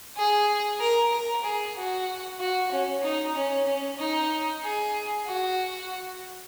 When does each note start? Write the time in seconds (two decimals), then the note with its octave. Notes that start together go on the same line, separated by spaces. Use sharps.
0.17 G#4
0.80 A#4
1.12 A#4
1.43 G#4
1.76 F#4
2.40 F#4
2.71 C#4
3.03 D#4
3.35 C#4
3.66 C#4
3.99 D#4
4.63 G#4
5.27 F#4